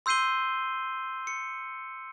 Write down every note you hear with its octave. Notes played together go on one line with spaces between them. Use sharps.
C6 E6 G6 C7 D#7 G7
C#7